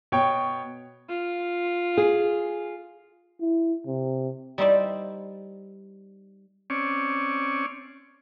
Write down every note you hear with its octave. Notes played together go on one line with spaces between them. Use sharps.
B2 C#5 G5
F4
G#4
E4
C3
G3 D#4 E4 C5 D5
C4 C#4 C#5 D5